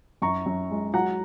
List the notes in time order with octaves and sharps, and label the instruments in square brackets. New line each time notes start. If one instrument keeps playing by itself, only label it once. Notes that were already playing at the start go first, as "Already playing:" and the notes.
[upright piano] F#2 A#5 C#6
F#2
G#3
F#3 F#5 A#5